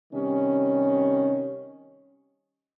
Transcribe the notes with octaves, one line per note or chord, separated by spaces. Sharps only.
C3 D#3 G3 C#4